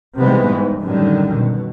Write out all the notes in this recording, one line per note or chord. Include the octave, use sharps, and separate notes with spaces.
C3 D#3 E3 G3 G#3 B3
G#2
F#2 A2 D3 D#3 G3
B2